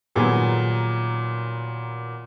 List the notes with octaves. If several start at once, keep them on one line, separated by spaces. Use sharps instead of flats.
A#2 D#3 F#3 G3 B3 G#4